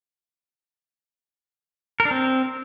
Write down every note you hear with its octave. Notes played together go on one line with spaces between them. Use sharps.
A#4
D4
C4